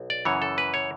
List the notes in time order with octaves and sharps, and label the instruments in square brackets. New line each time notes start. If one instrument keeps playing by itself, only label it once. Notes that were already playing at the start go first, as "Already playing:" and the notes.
Already playing: [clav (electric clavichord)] B1
D5
F#2 C#3 E3 C#5
A4
B4
C#5